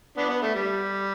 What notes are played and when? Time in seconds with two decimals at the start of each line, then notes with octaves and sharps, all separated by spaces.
0.17 B3 D4
0.29 B3
0.42 A3
0.55 G3